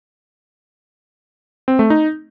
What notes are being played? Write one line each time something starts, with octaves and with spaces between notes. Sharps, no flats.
C4
A3
D#4